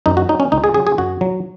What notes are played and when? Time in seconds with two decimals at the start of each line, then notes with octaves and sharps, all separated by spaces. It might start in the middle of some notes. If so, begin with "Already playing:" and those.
0.06 F#2 D#4
0.17 F#4
0.29 F#3 D#4
0.40 C#4
0.52 C#2 D#4
0.64 G#4
0.74 C#3 F#3 G#4
0.87 G#4
0.98 F#2 F#4
1.21 F#3